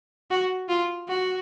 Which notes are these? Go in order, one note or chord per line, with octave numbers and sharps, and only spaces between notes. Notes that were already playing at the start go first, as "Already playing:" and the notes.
F#4
F4
F#4